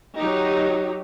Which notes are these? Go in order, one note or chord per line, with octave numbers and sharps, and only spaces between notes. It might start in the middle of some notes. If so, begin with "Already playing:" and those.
F#3 D#4 G4